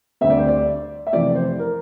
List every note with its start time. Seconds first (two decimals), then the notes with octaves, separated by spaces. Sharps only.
0.21 D2 D3 G3 C4 E5
0.30 D5
0.39 C5
0.48 D5
1.07 E5
1.13 F2 C3 E3 A3 C4 D5
1.35 C5
1.59 A#4